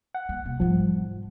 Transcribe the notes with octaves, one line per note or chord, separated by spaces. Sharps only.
F#5
A#3
C3
G#2 F3 G3